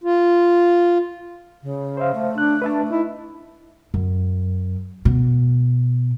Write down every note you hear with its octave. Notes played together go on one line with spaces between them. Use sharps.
F4
C#3
C5 E5 F5
A3
D4 F#6
D4 B4 E5 A5
D#4 E4
F#2
B2